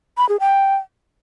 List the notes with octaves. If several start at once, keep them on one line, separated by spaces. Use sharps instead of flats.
B5
G#4
G5